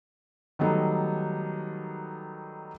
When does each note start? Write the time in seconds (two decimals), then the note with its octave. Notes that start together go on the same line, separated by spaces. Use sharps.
0.59 D#3 F#3 G3 A3 B3 D#4